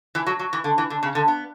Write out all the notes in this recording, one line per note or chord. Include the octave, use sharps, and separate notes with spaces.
E3
F#3
F#3
E3
D3
E3
D3
C#3
D3
B3